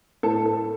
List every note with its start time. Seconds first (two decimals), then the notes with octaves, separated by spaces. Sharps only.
0.23 A2 A4
0.46 A4